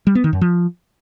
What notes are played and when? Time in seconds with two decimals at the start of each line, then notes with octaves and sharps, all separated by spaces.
0.07 G3
0.15 B3
0.24 D#3
0.33 F#2
0.41 F3